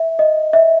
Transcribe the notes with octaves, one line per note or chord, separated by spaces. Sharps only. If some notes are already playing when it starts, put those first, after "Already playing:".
Already playing: E5
D#5
E5